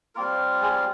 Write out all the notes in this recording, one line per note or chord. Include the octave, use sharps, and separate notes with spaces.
G3 A#3 C4 F4 A#4
G#3 G#4